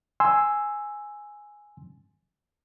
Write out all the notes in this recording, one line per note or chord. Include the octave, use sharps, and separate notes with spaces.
G#5 C6 E6